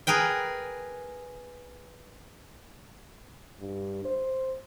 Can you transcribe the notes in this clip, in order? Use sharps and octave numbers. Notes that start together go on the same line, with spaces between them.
G#4 A#4 B4 G5
G2
C5